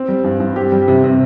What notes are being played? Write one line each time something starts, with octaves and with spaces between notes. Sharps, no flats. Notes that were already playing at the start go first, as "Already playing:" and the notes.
Already playing: C4
G3
G2
G2
C4 G4
G3
C3
C3